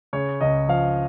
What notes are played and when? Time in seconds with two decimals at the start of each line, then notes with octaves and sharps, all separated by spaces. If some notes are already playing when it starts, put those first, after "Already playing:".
0.13 C#3 C#5
0.41 C#2 D#5
0.68 F3 F5